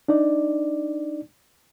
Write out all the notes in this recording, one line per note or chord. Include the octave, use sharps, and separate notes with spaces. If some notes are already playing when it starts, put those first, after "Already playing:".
D4 D#4 D5